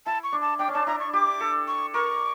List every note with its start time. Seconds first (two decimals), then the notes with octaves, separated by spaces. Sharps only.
0.06 E4 A5
0.23 C#6
0.32 D4
0.42 A5
0.59 D4 G5
0.68 C#4
0.74 D4 A5
0.87 E4 A#5
1.00 C#6
1.13 G4 D6
1.40 A4
1.68 C#6
1.94 A#4 C#6